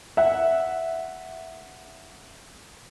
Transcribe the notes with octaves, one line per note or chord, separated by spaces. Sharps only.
E5 F#5